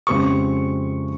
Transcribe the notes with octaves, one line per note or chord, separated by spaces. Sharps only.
F2 C#3 G#3 C4 G4 C#6